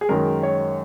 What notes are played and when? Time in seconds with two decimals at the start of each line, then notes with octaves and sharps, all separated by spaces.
0.01 G#4
0.09 F#2 D#3 G#3 A#4
0.43 C#5